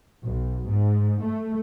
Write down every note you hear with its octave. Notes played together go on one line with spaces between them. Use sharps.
B1
G#2
A3